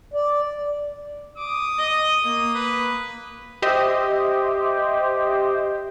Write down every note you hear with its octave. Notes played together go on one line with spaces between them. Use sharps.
D5
D6 D#6
D#5
A#3
B4
G4 C5 D#5 E5